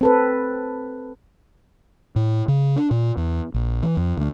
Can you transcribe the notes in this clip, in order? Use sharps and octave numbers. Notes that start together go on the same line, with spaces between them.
C4 A4 B4
A2
C#3
D4
A#2
E2
A#1
E3
F2
D2